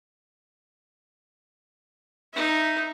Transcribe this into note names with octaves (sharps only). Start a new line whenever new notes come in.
D#4 E5